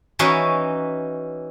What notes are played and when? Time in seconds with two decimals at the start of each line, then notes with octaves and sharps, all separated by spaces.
0.19 E3 C#4 D#4 F#4 B4